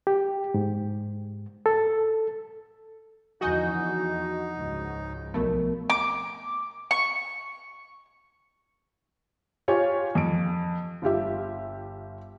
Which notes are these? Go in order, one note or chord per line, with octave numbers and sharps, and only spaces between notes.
G4
G#2
A4
E2 D3 F3 D#4 F#4 D#5 G#5 G6
C#2 G#2 C#3
B1 F3 A3 B3 A#4
D6
C#6
F4 G4 C#5 F5 G#5 C#6
F2 D7
G1 F4 G4 E5